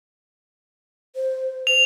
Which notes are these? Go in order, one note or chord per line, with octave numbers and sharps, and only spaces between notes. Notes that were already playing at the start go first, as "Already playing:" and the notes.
C5
F7